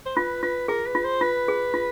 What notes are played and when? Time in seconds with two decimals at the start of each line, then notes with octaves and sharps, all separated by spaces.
0.05 C5
0.16 F4 B4
0.43 F4 B4
0.68 G#4 A#4
0.86 B4
0.95 F4
1.05 C5
1.21 F4 B4
1.48 G#4
1.74 F4